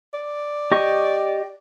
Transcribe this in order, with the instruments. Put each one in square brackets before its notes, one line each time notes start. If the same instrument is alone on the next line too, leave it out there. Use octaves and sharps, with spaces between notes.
[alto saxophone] D5
[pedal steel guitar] G4 D#5 C#6